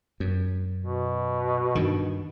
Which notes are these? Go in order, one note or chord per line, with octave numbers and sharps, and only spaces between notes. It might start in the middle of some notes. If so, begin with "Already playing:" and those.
F#2
B2
G2 D#3